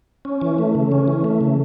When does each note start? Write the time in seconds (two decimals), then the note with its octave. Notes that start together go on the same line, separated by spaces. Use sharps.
0.25 C#4
0.41 E3
0.59 A3
0.75 C#3
0.92 C#4
1.08 E3
1.24 A3
1.41 C#3